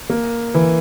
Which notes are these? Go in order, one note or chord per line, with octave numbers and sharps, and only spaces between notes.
A#3
E3